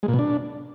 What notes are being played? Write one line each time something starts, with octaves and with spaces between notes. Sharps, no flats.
G#3
A#2
B2
D4